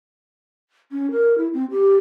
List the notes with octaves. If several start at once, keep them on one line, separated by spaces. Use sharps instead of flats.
C#4
A#4
E4
C4
G4